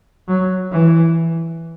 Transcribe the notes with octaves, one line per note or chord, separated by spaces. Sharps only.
F#3
E3